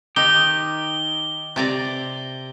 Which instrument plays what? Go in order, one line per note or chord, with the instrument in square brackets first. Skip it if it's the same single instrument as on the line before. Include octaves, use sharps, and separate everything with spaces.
[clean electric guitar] D#3 G4 [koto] D#4 [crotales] G7
[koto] C3 D5 A#5